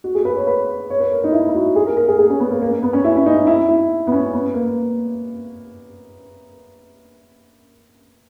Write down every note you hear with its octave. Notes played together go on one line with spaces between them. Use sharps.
F#4
G#4
B4
C#5
B4
C#5
B4
A#4
D#4
E4
E4
F#4
G#4
A#4
A#4
G#4
G#4
C#4
B3
A#3
A#3
A#3
B3
C#4
E4
C#4
D#4
D#4
E4
E4
B3
C#4
B3
A#3